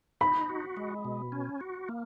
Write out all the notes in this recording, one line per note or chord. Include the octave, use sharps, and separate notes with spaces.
D#4 B5
F#4
G#3
B2
C#4
F#4
A#3